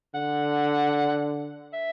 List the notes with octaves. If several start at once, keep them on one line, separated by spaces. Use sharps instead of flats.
D3 F#5
E5